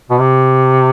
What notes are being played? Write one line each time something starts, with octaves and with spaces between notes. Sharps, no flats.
B2
C3